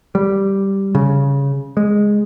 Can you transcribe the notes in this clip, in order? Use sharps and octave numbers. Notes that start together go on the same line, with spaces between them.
G3
C#3
G#3